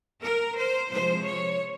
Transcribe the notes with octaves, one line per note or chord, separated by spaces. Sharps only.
A#4
C5
C3 F3 G#3 C5
C#5